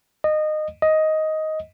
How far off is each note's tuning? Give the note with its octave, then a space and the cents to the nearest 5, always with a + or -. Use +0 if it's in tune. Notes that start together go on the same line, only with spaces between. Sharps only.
D#5 -20
D#5 +10